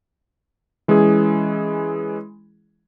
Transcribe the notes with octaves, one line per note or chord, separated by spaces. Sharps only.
E3 G#3 C#4 E4 G#4